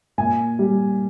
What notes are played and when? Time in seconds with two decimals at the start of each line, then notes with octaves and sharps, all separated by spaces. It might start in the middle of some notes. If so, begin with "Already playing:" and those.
0.18 A#2 G#5
0.59 G3